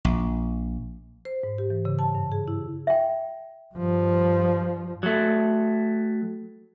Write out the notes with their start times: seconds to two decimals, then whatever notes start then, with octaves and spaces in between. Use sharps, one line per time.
0.05 A#1
1.25 C5
1.43 G#2
1.58 G4
1.70 E3
1.85 C#3
1.99 A5
2.15 G2
2.32 G#4
2.48 E4
2.87 E5 G5
3.74 G2 F3
5.03 F#3 A3